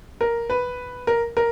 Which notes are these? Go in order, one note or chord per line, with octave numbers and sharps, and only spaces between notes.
A#4
B4
A#4
A#4